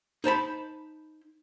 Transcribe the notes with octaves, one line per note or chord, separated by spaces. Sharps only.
D#4 C5 A5 B5